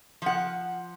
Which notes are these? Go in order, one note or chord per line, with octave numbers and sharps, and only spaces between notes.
F3 F#5